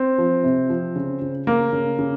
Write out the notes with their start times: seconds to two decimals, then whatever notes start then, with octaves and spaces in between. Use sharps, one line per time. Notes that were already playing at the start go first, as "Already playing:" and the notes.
Already playing: C4
0.18 F3
0.44 C3
0.69 F3
0.96 C#3
1.22 C#3
1.47 C#3 A#3
1.73 C#3
1.99 C#3